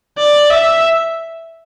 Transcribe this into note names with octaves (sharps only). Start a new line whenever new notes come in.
D5
E5